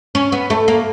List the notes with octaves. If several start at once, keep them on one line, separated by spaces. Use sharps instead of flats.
C#4
B3
A3
A#3